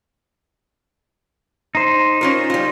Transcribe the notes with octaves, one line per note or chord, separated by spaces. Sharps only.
D#4 C5
C#4 F4 A#4
G3 F4